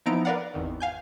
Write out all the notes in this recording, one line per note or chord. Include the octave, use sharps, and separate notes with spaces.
F3 B3 D#4 E4 A#5 D7
A#4 B4 D5 F5 F#5
G#1 E2 D#3
F5 G#5 G6